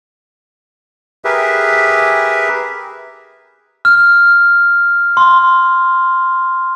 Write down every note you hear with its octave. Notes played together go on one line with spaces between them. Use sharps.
G4 G#4 A#4 B4 E5
F6
C6